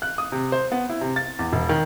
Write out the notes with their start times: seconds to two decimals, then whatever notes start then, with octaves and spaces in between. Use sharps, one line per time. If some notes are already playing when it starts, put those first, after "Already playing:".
0.02 F#6
0.18 D#6
0.32 C3
0.52 C5
0.72 B3
0.90 E4
1.01 C3
1.16 A6
1.39 E2
1.53 E1
1.69 D#3